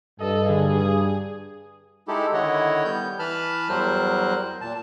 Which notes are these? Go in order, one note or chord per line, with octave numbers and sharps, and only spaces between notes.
G2 A4 D#5
D3 G#4
D#6
G#3 D#4 E4 G4 A4
D3 D#3 E4 C#5 D#5 F#5
G3 B3 G6
E3 B4 A5 B5 F6
E2 F#3 G3 A#4 C5 F#6
A#2 A5